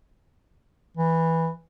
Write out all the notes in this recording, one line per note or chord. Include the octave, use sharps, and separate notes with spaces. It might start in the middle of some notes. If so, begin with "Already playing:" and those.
E3